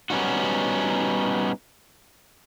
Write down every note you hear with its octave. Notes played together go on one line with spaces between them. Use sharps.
G3 B3 C#4 D#4 F#4